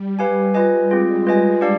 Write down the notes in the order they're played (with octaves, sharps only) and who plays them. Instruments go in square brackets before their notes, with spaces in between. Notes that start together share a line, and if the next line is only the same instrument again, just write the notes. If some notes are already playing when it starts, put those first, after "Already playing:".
Already playing: [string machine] G3
[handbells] G4 B4 F5 G#5
F4 B4 D#5 G#5
[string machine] G#3 [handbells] C4 F4 G#4
[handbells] F4 B4 D#5 G#5
D4 G4 D5 F5